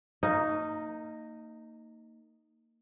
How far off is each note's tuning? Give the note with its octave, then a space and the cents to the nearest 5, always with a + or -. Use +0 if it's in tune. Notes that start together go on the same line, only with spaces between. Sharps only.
A#3 -30 D#4 +0